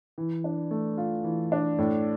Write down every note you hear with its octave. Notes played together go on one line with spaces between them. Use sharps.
E3
D4
A3
F4
E3
D4
A2